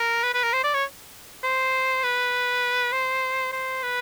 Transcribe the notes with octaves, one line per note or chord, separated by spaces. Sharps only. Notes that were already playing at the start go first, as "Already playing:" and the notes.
Already playing: A#4
B4
B4
A#4
C5
D5
C#5
C5
B4
C5
C5
B4